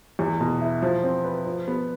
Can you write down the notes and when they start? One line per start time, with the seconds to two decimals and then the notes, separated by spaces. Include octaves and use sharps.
0.19 E2
0.41 B2
0.62 E4
0.82 F3
1.04 C4
1.24 B4
1.46 F3
1.68 B3